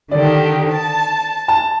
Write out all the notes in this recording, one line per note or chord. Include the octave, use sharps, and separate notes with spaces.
D3 D#3 G4 D5
A5
A5